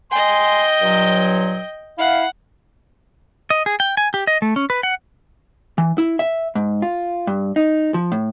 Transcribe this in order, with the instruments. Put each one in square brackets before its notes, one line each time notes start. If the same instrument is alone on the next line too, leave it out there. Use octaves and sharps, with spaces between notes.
[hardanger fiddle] D#5 G5 [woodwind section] G#5 C6
[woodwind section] G2 A#2 F#3
[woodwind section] E4 F5 [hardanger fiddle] F#5
[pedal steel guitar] D#5
G#4
G5
G#5
G4
D#5
A3
C#4
B4
F#5
[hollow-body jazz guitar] E3
E4
E5
G#2
F4
G2
D#4
F3
A2